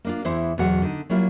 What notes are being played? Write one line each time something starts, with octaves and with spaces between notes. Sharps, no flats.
A#3 D4 F4
E2 E3 B3 E4 C5
E2 B2 F#3 F#4 F#5
D3 D#4
F#3 G3 A#3 E4 F4